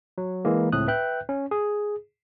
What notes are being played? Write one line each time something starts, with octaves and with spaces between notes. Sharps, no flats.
F#3
E3 G#3 A#3
C#2 A2 A3 C4 D#6 F#6
B4 E5 G5 F#6 G6
C#4
G#4